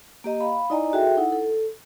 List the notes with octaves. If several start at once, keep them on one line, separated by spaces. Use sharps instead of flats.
A#3 G4 D#5 A#5
F5 B5
D#4 E4 D5 D#5 G#5 A#5
F#4 G#4 A4 E5 G5
D#4 E4 A4 F#5
A4